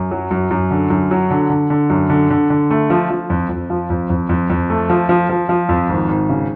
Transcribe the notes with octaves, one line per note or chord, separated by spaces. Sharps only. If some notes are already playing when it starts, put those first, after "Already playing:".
Already playing: F#2
F#3
F#2
F#2
D3
F#2
F#3
D3
D3
D3
F#2
D3
D3
D3
A3
F3
F3
F2
F2
F3
F2
F2
F2
F2
A3
F3
F3
F3
F3
F2
G#1
G#1
C#3